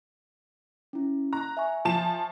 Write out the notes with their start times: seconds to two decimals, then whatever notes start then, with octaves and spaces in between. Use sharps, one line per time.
0.93 C#4 E4
1.33 A#5 F#6
1.57 E5 G#5 C#6
1.85 F3 A5 E7